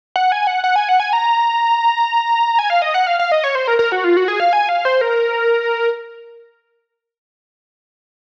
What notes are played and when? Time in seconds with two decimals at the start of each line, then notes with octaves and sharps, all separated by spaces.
0.16 F#5
0.32 G#5
0.47 F#5
0.64 F#5
0.76 G#5
0.89 F#5
1.00 G#5
1.13 A#5
2.59 G#5
2.70 F5
2.82 D#5
2.94 F#5
3.07 F5
3.19 F5
3.32 D#5
3.44 C#5
3.55 C5
3.68 A#4
3.79 A#4
3.92 F#4
4.04 F4
4.17 F#4
4.28 G#4
4.40 F5
4.53 G#5
4.69 F5
4.85 C5
5.01 A#4